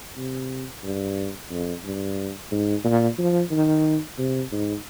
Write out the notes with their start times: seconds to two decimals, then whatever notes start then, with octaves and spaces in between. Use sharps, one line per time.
0.17 C3
0.84 G2
1.51 F2
1.84 G2
2.51 G#2
2.84 A#2
3.18 F3
3.51 D#3
4.18 C3
4.51 G#2